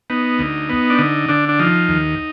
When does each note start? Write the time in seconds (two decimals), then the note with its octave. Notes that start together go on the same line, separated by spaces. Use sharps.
0.10 B3 D#4
0.39 D2
0.69 B3
0.90 D4
0.98 D3 D#4
1.28 D3 D4
1.49 D4
1.59 F3 D#4
1.89 D#2